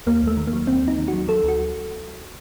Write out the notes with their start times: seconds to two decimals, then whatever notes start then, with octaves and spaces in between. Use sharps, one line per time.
0.07 D#2 A#3
0.22 D#2 A3
0.37 D#3
0.47 A#3
0.53 F#3
0.67 D#2 C4
0.83 D#2
0.88 D#4
0.98 D#3
1.08 F#3 F#4
1.28 F#3 A4
1.43 D2
1.48 F#4